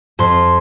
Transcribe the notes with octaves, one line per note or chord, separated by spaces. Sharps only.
F2 C6